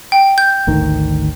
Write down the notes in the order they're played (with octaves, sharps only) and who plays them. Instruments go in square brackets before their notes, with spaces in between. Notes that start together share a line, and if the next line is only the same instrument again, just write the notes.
[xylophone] G5
G6
[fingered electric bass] G#1 D2 D#3